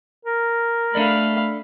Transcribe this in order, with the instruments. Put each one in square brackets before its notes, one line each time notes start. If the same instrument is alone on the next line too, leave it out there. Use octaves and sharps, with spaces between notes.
[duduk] A#4
[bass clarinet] A3 [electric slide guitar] D4 A4 D5 [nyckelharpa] F5 B5